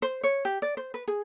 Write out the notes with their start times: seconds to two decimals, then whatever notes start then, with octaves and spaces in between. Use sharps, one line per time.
0.02 C5
0.24 C#5
0.45 G4
0.62 D5
0.77 C5
0.94 B4
1.08 G#4